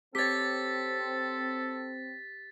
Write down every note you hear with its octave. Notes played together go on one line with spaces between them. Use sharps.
C4 G4 A4 C#5 A6 B6